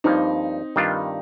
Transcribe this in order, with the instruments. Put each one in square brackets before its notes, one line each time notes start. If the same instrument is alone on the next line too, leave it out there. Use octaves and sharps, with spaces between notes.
[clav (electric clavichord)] G2 F3 A#3 [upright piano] C4 D#4
[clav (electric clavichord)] G2 D#3 G3 D4 F4